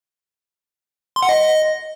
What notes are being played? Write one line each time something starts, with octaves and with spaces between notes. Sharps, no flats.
C6
F#5
D#5